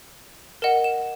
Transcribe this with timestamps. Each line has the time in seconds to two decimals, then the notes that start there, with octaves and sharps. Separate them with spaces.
0.62 A#4 D#5 F#5 E7
0.84 E7